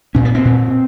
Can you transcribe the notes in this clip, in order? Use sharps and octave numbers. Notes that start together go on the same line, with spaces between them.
A#2 C#4
B3
C4
A#2